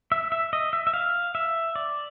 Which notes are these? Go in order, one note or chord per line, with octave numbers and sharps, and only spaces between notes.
E5
E5
D#5
E5
E5
F5
E5
D5